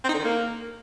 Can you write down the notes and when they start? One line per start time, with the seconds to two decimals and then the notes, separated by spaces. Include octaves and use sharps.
0.04 C4
0.09 D#4
0.14 D3
0.19 D#3
0.24 A#3